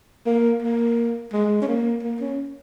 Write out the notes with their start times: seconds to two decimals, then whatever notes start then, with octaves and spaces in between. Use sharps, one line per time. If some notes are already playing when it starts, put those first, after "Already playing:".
0.26 A#3
0.62 A#3
1.33 G#3
1.62 C#4
1.68 A#3
2.03 A#3
2.21 C#4